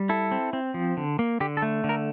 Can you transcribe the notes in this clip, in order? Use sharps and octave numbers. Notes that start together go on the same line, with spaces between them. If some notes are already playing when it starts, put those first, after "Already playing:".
Already playing: G3
E4 A4
C4
C4
F3
D3
A#3
D3 G4
A4
A3
D3
A#4